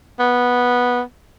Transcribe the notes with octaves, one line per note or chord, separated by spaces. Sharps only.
B3